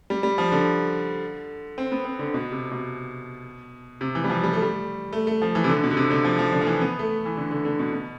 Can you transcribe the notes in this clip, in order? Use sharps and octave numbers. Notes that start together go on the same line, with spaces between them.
G3
G3
F3
D3
C4
B3
C4
D3
B2
C3
B2
C3
E3
G3
F3
G3
A3
G3
A3
A3
F3
E3
C3
D3
B2
D3
C3
D3
F3
F3
D3
F3
E3
B3
A3
E3
D3
D3
D3
B2
B2